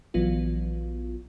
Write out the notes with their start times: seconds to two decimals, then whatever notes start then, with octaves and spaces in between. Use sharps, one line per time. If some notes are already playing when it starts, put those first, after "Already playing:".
0.14 A#1 E3 F#3 B3 F4